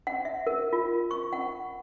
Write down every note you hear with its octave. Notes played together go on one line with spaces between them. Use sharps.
F#5
E5
A#4
F4
C#6
F#5